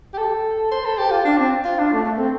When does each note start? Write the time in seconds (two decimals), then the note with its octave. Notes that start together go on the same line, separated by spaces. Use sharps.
0.13 G4
0.18 A4
0.71 C5
0.85 A4
0.98 G4
1.11 F4
1.25 D4
1.38 C4
1.64 F4
1.78 D4
1.92 A3
2.04 A3
2.18 C4